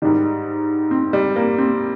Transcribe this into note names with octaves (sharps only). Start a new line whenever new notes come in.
G#2 D#3 G3
C4
G3
A#3
C4